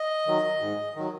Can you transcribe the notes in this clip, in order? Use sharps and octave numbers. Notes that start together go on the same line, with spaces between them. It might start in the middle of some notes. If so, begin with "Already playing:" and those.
Already playing: D#5
D#3 F#3
G#2
D#3 F#3